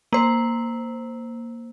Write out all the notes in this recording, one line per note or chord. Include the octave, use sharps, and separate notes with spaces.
A#3 C5